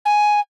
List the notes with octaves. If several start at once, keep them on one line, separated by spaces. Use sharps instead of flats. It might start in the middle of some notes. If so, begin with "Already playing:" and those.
G#5